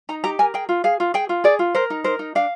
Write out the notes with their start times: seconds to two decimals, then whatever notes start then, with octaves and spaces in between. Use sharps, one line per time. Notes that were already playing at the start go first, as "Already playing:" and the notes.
0.09 D#4 A#5
0.24 G4 A#5
0.39 A#4 G#5
0.54 G#4 G5
0.69 F4
0.84 G#4 F5
1.00 F4
1.14 G#4 G5
1.29 F4
1.44 G#4 D5
1.59 F4
1.75 A#4 C5
1.90 D#4
2.04 A#4 C5
2.19 D#4
2.35 D4 F5